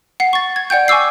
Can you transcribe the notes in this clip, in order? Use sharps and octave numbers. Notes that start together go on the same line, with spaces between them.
F#5 C7
C#6 A6
G#6
D5 F#5 G5 G6
G#5 C#6 D6 E6 C7